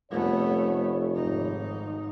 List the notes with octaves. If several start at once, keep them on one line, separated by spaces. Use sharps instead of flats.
F1 A3 B3 C#5
G#1 D#4